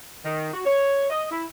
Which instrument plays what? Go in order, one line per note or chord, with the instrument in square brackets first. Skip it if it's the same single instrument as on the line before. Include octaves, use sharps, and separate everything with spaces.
[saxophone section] D#3
F#4
C#5
D#5
E4